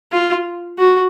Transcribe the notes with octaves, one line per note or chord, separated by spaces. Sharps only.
F4
F#4